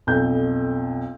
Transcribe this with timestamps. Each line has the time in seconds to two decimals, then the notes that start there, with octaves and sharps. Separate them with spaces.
0.07 B1 F2 G6